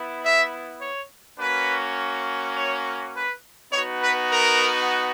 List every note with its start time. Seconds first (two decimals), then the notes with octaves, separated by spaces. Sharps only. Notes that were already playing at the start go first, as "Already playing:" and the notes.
Already playing: B3 E4
0.23 E5
0.81 C#5
1.39 A#3 C#4 F#4 B4
2.55 C#5
3.13 B4
3.71 B3 D#4 F#4 C#5
4.01 B4
4.29 A#4